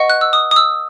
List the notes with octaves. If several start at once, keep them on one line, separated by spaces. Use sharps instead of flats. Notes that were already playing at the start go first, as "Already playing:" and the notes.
Already playing: B4 D#5 F#5 C#6
F#6
E6
D#6
D#6
E6